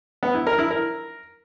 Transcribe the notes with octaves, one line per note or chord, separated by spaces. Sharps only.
B3
E4
A#4
E4
A#4